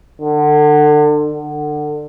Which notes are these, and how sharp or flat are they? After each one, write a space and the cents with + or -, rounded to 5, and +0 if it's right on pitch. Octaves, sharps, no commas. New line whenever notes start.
D3 +30
D3 +25